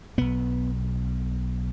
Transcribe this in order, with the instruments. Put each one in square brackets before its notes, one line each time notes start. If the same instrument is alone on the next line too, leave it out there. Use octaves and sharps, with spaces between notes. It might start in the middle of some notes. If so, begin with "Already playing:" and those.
[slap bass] B1 B2 B3